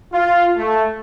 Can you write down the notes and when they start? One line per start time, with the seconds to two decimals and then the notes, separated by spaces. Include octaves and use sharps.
0.13 F4
0.57 A3